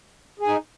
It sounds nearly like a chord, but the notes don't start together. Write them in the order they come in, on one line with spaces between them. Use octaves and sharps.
G#4 G#5 D#4